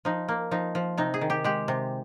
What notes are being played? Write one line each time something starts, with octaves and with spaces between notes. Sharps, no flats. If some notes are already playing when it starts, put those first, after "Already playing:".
F3 D#4
A#3
F3 D#4
F3
C3 D#4
G#4
D#3
G4
G#3 G4
C3